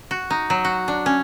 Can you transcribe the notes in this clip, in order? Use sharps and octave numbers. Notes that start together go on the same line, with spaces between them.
F#4
D#4
F#3
F#4
D4
C#4